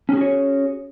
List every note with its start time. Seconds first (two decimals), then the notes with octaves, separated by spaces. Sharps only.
0.09 C#4
0.13 G#4
0.17 F#4
0.21 C#5